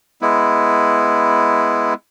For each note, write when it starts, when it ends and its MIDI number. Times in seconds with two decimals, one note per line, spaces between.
0.22 1.94 56
0.22 1.94 59
0.22 1.94 64